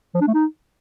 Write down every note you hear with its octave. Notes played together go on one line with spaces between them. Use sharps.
F3
D4
A3
D#4